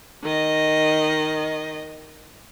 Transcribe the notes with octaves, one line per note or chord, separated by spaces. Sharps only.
D#3 D#5